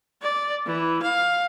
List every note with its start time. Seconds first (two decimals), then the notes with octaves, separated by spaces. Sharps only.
0.22 D5
0.66 E3
1.03 F5